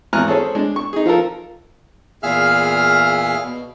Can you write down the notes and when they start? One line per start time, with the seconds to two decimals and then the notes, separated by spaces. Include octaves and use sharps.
0.13 G#1 E2 G#5 A#5 F6 F#6
0.28 C4 C#4 G#4 A4
0.55 G#3 D4
0.76 C#6
0.93 D#4 G#4
1.06 F3 F4 A4 A#4
2.23 E2 A#2 G#4 E5 F5 F6
3.43 B2